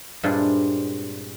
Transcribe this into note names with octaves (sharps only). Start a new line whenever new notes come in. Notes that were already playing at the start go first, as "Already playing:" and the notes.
G2 A#2 G#3 C4 D4 E4